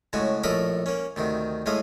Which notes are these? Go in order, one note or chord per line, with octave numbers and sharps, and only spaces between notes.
A2 C#3 G#3 F#4
A#1 A2 A4 A#4 D#5 B5
A#3 C#4
D2 C3 D#3
A2 G#3 A3 F5 D#6